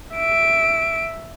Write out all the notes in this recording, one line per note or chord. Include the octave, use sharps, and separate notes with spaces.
E5 D7